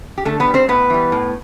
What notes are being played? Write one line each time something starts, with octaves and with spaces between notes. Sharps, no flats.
G4
D3 A3 A4
B3 B4
G3
C4 C5
A2 B3 B4
E3 G3
A2